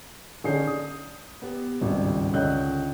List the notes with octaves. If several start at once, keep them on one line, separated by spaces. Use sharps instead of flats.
D3 C#4 D#4 G#4 G6 C7
D#6
B3 G4
G#1 C#2 G2
C#2 D3 C#5 D#5 F#6 G6